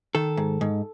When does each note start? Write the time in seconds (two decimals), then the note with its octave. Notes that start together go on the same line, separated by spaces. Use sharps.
0.15 D#3 A4
0.37 G#2
0.61 G#2